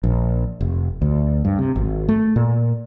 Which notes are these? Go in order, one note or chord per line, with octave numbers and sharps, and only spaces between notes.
A#1
F1
D2
G2
C3
G#1
A3
A#2